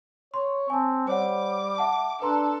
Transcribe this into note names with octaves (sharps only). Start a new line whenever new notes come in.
C#5 C6
C4 G#5 A5
G3 C5 C#5 F#5 D6
E5 F#5 A5
D4 A4 B4 A#5 C6